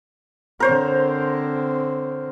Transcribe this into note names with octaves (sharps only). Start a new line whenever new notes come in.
D3 C4 A#4 C5 C#5